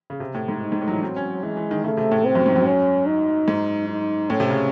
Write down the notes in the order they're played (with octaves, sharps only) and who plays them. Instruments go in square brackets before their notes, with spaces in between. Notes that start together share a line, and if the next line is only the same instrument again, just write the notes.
[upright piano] C#3
C3
A2
G#2
[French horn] D#4
[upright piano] G#2
A2
F#3
E3
[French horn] F#3 [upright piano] C4
[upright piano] C#4
[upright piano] E3 [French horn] G#3
[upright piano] E3
D#3
[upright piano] C#3 [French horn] A3
[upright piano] C3
A2
[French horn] C4
[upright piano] F#2
G#2
F#2
[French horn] C#4
D#4
[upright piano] G#2
[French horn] D#4
[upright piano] A2 [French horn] C#4
[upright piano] C3
C#3